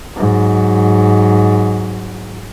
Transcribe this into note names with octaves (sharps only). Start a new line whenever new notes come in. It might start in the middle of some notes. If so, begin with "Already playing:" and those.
G#2 F#3